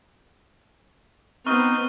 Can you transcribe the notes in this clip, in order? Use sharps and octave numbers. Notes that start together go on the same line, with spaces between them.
B3 C4 D#4 C#6 F6 D#7